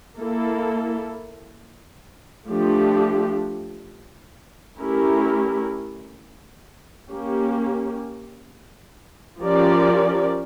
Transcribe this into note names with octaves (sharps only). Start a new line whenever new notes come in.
A#3 E4 A4
F3 A3 D4 G4
A3 C#4 E4 G4 A#4
A#3 C#4 G4
F3 C#4 G4 A#4 D5